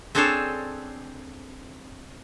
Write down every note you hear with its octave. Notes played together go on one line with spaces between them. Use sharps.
C4 D4 G#4 A4 C5 C#5